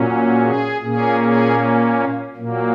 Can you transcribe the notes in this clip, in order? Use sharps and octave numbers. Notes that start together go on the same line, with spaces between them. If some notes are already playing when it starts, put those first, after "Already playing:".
Already playing: A#2 F#3 C#4
G#4
A#2 A#3 C#4 G#4
G#4
A#2 F#3 A#3